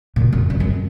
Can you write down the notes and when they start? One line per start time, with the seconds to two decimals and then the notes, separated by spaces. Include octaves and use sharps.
0.16 A#2
0.32 F#2
0.50 F#2
0.60 F#2